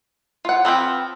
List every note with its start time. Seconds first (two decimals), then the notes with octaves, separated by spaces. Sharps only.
0.45 F4 F#5
0.65 F3 C4 B4 G5